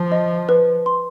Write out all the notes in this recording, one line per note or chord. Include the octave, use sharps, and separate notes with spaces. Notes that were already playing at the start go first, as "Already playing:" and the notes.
Already playing: F3
D#5
B4
C6